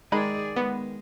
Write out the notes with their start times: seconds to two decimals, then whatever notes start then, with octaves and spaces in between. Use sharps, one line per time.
0.12 D#3 G#3 G#4 D5 B5
0.56 G#3 B3